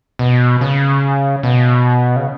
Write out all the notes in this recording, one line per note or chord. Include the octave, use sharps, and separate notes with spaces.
B2
C#3
B2
C#3